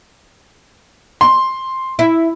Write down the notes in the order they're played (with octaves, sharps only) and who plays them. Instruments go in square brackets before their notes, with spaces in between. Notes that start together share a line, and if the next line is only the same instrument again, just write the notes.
[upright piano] C6
[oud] E4